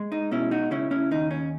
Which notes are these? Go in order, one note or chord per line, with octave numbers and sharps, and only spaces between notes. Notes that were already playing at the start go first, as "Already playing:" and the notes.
Already playing: G#3
D#4
B2 C#4 E4
D#4 F#4
C#3 C#4 E4
C#4 E4
D#2 D#4
C#4